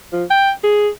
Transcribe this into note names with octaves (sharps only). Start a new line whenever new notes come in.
F3
G5
G#4